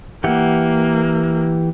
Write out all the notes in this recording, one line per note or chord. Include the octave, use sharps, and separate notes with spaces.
E3 A#3 G4 F#5